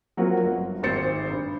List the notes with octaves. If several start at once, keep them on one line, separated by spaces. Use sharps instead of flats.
F#3 A#3 C4 F4 F#4
G1
G#1 C4 C5 A6 C#7
G2